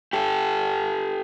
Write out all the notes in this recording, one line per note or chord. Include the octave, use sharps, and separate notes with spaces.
G4 A4